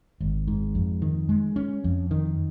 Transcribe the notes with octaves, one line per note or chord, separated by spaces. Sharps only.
G#1
G#2
F2
D#3
G#3
C#4
F2
D#3